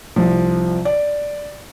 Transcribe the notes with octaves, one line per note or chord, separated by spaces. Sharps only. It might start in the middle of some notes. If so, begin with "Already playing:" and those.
C2 F3
D5